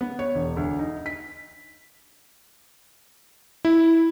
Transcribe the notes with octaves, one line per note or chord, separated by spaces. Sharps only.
B3
C#5
E1
D2
D#4
B6
E4